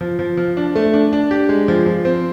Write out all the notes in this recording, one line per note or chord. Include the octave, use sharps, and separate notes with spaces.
F3
F3
F3
D4
A3
D4
D4
G4
G#3
F3
F3
C4